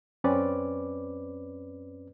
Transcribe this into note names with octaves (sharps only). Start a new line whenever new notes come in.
F#2 C4 C#4 B4 D5 D6